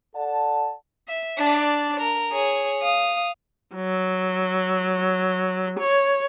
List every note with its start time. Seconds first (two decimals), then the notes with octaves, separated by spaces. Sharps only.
0.15 A4 D5 F#5 A5
1.08 E5
1.38 D4 D5
2.00 A#4
2.32 G#4 C#5
2.82 F5 D#6
3.75 F#3
5.79 C#5